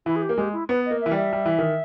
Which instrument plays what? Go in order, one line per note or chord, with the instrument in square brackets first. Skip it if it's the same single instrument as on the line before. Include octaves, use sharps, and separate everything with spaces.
[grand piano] E3 [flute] E4
[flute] G#4
G4
[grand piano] A#3
[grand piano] G#3 [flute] G4
[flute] E4
[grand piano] B3 [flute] B4
[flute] D#5
[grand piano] A#3
[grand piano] E3 [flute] E5
[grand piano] G3
[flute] E5
[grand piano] G3
E3
D#3